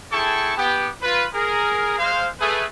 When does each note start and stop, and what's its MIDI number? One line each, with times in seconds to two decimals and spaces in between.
0.11 0.52 64
0.11 0.52 68
0.11 0.52 69
0.11 0.52 79
0.11 0.52 81
0.11 0.52 85
0.56 0.88 59
0.56 0.88 67
1.02 1.26 65
1.02 1.26 71
1.34 1.95 68
1.34 1.95 70
1.99 2.27 56
1.99 2.27 72
1.99 2.27 77
2.39 2.64 57
2.39 2.64 68
2.39 2.64 71